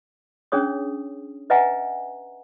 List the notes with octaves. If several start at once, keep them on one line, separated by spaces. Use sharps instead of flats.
C#4 D4 G#4 C#5 D#6
B4 D#5 E5 F#5 G#5 A#5